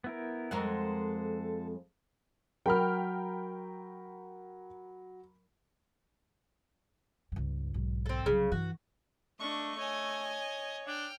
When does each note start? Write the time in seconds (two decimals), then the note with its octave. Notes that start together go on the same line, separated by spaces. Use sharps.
0.04 B3 E4 A#4
0.51 F2 G#3 A4 A#4 C5 F#5
2.66 F#3 A#4 G5 A#5 B5 F6
7.32 C#2 G2
7.74 B1 G#2
8.06 C4 A4
8.26 C2 C#3 F#3
8.52 G2 E3 F#4
9.40 A3 D4 D#5 C#6
9.79 C#5 D#5 G#5
10.87 D4 G5 F6